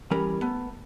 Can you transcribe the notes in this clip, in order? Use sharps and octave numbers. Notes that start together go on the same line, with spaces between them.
E3 G3 C#4 A#4 B5
A3 B3